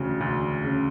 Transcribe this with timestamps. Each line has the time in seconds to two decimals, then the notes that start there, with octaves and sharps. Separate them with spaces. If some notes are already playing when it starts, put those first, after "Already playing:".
Already playing: E1 D2 C#3
0.21 D2
0.64 C#3